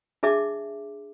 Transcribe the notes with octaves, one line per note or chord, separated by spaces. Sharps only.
D4 G#4 D#5 E5 A5 D6